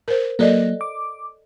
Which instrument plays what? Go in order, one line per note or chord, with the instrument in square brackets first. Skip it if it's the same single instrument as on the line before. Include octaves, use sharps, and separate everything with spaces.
[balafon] A#4 C5
[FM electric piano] F#3 A#3 [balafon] A4 D5 D#5
[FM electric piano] D6